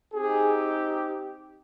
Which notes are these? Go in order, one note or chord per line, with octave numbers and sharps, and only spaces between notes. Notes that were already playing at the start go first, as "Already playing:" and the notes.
C4 D#4 G4 G#4